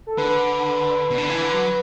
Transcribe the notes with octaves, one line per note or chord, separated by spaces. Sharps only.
A4
D3 B4
B2
D3
E3
D3
F#3